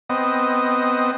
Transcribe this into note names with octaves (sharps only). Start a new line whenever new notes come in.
B3 C4 D#5